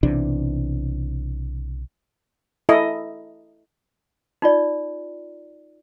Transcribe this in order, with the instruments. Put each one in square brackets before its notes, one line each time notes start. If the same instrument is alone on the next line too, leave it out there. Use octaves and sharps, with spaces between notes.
[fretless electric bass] B1 C3 E3 D4
[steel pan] E4 A4 D#5
[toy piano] D#4 F4 D5